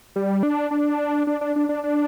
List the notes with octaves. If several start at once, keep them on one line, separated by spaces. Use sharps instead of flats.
G3
D4
D4
D4
D4
D4
D4
D4